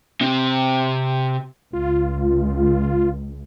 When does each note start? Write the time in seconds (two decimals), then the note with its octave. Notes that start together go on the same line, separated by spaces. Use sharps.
0.21 C3 C4
1.73 C#2 F4